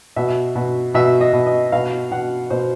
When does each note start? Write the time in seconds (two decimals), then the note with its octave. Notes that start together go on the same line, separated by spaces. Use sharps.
0.16 B2 E5
0.55 B2
0.94 B2 E5
1.21 D#5
1.33 B2
1.47 D#5
1.72 B2 F5
2.11 B2 F#5
2.50 B2 C5